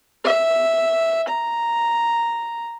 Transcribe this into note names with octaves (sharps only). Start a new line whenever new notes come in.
E5
A#5